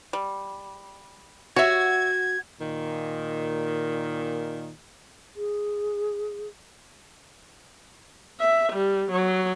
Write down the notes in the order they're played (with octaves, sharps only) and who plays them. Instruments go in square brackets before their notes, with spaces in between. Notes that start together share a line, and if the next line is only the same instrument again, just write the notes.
[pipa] G3
[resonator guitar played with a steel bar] F#4 [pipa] C#5 E5 [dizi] G#6
[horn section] A#2 D#3
[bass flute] G#4
[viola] E5
G3
F#3